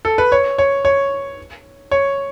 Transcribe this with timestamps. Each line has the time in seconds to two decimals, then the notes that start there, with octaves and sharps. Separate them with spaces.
0.05 A4
0.18 B4
0.32 C#5
0.58 C#5
0.85 C#5
1.91 C#5